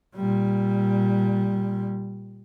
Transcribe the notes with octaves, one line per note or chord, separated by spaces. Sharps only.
A#2 G3